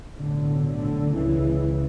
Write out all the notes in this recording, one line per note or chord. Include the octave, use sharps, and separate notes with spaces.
B1 A2 D3
D3
C#2 C#3 E3